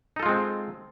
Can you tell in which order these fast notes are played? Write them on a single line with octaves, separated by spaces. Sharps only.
D#4 A4 F4 G#3 C4